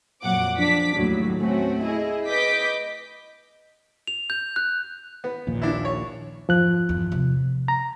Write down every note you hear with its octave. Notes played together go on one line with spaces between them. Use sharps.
F2 A#2 F#3 F#5 D6
F3 D4 D6 B6
D#2 A2 F#3
A3 C4 C#4 F#4
E4 G#4 D#5
B4 D#5 D6 G6 B6
F7
G6
F#6
B3
A#1 D#2 A#2
D4 E4
C#5
F2 G#2 F3 F#6
G1 E2
C3 B3
A#5